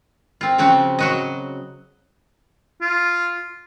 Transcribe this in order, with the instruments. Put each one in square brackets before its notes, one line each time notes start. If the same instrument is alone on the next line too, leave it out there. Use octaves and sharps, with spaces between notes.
[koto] C4 F4
C#3 F3 C4 F#4
F#3 F#4 D#5
[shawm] F4